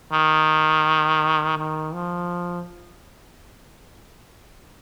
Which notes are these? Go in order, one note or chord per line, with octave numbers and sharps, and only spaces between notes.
D#3
D#3
F3